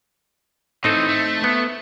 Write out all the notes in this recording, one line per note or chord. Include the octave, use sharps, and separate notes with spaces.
A2 E3 C4 D#4 A4
A3
B3